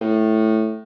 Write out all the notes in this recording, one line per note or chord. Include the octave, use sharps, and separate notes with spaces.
A2